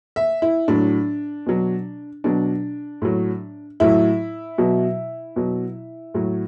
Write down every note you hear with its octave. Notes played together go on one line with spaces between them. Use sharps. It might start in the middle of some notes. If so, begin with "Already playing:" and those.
E5
E4
A2 F#3 D4
B2 F#3
B2 F#3 D4
A2 F#3
A2 F#3 E4
B2 F#3
B2 F#3
A2 F#3